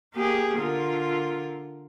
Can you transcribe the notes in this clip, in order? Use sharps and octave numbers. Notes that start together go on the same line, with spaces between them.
A#3 G4 G#4
D3 F4 A#4